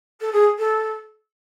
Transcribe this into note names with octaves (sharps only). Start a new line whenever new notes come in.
A4
G#4
A4